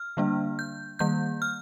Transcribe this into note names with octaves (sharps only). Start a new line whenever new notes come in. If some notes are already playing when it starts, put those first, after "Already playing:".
Already playing: F6
D3 G3 A#3 D4
G6
D#3 G3 A#3 G6
F6